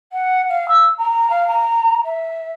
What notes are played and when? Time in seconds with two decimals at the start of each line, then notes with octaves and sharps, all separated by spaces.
0.12 F#5
0.48 F5
0.68 E6
0.98 A#5
1.30 F5
1.47 A#5
2.04 E5